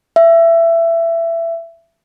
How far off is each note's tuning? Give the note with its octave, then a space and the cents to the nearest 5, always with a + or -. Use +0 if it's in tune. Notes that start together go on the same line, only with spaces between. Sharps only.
E5 +20